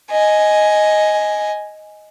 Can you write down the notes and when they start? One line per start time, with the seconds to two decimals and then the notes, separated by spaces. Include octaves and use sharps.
0.11 D#5 G#5